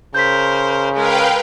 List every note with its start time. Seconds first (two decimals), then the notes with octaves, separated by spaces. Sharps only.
0.14 C#3 A#4 C5 G6 B6
0.95 G#3 A#4 B4 F5 G5